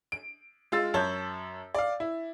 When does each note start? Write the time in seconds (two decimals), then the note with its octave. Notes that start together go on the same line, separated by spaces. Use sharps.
0.12 D7
0.72 G#3 F4 F5 E6 A6
0.94 F#2 C#5 A5 G6
1.75 D5 F5
2.00 E4